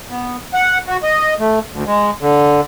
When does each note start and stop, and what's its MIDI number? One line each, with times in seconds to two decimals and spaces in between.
0.11 0.37 59
0.54 0.78 78
0.87 0.97 66
1.03 1.34 75
1.40 1.59 57
1.72 1.83 38
1.87 2.10 56
2.21 2.61 50